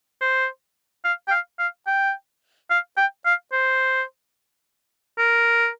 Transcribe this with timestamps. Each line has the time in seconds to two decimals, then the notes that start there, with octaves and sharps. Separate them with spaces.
0.21 C5
1.04 F5
1.28 G5
1.31 F5
1.59 F5
1.87 G5
2.70 F5
2.97 G5
3.25 F5
3.52 C5
5.18 A#4